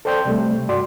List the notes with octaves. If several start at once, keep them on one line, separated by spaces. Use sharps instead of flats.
A4 C5 D5 G5 C6 G6
C3 G3 A3
G2 F#4 D5 C6